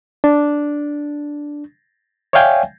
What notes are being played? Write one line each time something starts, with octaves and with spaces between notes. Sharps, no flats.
D4
C#5 D5 E5 F5 G5 G#5